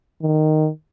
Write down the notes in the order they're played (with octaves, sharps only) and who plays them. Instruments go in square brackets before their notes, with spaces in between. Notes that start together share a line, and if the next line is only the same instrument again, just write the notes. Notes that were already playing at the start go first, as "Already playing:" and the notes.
[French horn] D#3